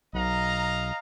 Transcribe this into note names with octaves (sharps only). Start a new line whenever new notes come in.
B1 D#5 F5 A#5